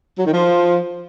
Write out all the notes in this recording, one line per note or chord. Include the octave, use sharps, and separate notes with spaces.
F#3
D#3
F3